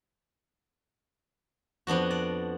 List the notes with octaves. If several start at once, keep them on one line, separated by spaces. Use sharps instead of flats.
F2 B3 D4 F#4
D5